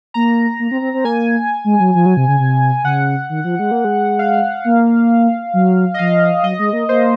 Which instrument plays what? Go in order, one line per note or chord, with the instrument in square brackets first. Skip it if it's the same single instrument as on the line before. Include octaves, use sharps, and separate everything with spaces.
[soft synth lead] A#3 [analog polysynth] A#5
[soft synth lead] A#3
C4
C4
C4
[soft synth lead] A#3 [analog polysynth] G#5
[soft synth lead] G#3
F#3
F3
F#3
C3
C#3
C3
[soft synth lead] C#3 [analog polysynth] F#5
[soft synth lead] D#3
F3
G#3
A#3
G#3
[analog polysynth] F5
[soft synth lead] A#3
F#3
[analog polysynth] D#5
[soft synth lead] F3 [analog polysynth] F5
[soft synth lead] F#3 [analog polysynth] D#5
[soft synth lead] G#3
A#3
[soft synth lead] A#3 [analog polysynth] C5